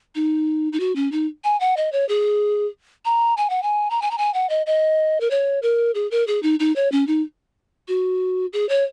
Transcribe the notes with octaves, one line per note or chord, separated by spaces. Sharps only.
D#4
D#4
F#4
C#4
D#4
G#5
F#5
D#5
C#5
G#4
A#5
G#5
F#5
G#5
A#5
G#5
A#5
G#5
F#5
D#5
D#5
A#4
C#5
A#4
G#4
A#4
G#4
D#4
D#4
C#5
C#4
D#4
F#4
G#4
C#5